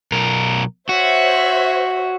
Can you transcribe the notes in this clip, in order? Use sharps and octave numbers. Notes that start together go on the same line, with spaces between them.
B1 A#4
F#4 C5 C#5 E5